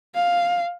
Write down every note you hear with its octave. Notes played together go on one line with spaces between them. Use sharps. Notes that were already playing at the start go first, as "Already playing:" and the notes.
F5